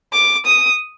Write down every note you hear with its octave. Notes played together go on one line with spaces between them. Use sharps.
D6
D#6